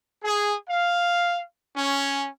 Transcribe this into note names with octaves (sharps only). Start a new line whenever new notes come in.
G#4
F5
C#4